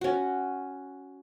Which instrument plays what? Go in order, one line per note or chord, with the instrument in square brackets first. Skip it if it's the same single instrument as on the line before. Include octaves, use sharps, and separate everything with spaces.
[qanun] C#4 F#4